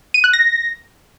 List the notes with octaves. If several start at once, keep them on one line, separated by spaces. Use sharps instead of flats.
D#7
F#6
A#6